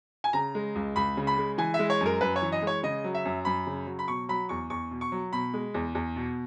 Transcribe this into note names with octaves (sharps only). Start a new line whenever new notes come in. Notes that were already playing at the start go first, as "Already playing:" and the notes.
G#5
C#3 A#5
G#3
C#2
C#2 B5
C#3
B5
G#3
E3 G#5
E5
G#3
C#5
F#2
A#4
F#2 B4
C#5
E3
D#5
G#3 C#5
C#3 D#5
F#3
E5
F#2
F#2 B5
C#3
F#3
B5
B2 C#6
F#3 B5
E2 C#6
E2 C#6
B2
C#6
F#3
B2 B5
G#3
E2
E2
B2